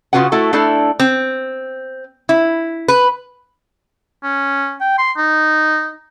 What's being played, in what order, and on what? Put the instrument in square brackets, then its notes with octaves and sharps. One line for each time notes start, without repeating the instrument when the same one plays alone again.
[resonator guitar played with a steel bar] C#3 A3 F4 F#4 B4 F#5
A3 E4 F#4 A4
A3 D4 E4 A4 D5
C4
E4
B4
[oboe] C#4
G5
C6
D#4